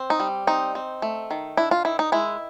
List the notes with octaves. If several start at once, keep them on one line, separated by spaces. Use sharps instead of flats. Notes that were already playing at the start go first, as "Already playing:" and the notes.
Already playing: C4
D#4
G3
C4 D#4
C4
A3
D#3
D4 E4
F4
D#3 E4
D#4
G#3 E4